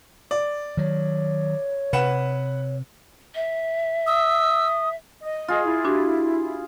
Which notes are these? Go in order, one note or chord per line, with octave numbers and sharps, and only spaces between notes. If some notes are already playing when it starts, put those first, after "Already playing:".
D5
D#3 F#3 C#5
C3 B4 F#5 E7
E5
D#6 E6
D#5
F4 G#4
E4
D4 F#4 G4